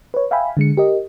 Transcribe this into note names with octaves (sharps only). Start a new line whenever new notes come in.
B4 C#5
E5 F5 G5 G#5 B5
D3 G#3 C#7
G4 A#4 D#5